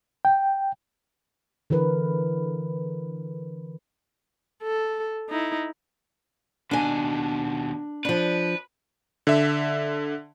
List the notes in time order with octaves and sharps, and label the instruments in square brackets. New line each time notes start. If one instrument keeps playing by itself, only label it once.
[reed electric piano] G5
[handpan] D3 E3 A#4 B4
[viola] A4
D#4 E4
[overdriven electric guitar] D#2 B2 [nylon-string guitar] D4 G#5
[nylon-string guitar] F3 D4 [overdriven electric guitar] B4
[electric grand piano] D3 E5